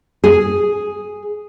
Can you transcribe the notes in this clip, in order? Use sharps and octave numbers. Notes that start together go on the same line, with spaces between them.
G#4